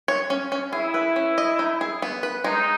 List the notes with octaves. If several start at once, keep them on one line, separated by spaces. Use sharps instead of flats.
C#5
C#4
C#4
E4 G#4
B4
C#4
D#5
D#4
G#4
B3
B4
G#3 D#4